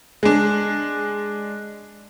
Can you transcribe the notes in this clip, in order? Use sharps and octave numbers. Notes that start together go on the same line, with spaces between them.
G#3 D4